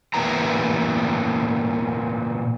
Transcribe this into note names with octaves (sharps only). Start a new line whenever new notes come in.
A#2 E3 B3 G4 A#5